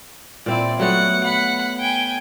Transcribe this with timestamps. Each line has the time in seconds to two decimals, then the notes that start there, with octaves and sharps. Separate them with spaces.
0.46 A#2 C4 E4 D5
0.80 F#3 A3 B3 F#5
1.24 F#5 B5
1.79 G5 G#5